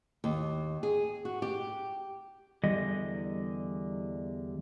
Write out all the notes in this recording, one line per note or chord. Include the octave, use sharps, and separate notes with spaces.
D#2
G#4
F#4
G4
E2 D3 G3 D#5